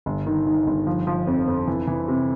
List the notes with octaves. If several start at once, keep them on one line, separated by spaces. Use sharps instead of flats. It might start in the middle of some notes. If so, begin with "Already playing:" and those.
G1
D#3
D#3
G1
F3
F3
F2
F2
E3
E3
C3